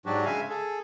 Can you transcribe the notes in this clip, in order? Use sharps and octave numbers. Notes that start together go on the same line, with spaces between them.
G#2 F#3 D4 F#4 G4
C#3 G#3 E5 F5 G#5
G#4 A4